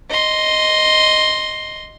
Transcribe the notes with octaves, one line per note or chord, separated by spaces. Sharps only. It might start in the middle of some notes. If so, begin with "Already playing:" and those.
D#5 C6